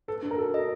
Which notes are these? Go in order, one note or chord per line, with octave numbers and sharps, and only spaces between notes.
A4 B4
D4 A4
A#4
F#4 A4
D#5